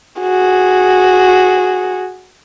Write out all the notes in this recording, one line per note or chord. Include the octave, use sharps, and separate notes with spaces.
F#4 G#4